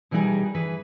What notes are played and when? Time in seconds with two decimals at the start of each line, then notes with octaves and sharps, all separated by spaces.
0.11 B2 E3 G3 D#4 G#4 A#4
0.54 E3 G#4 B4